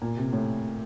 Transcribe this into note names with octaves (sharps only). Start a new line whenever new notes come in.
A#2
C3
A2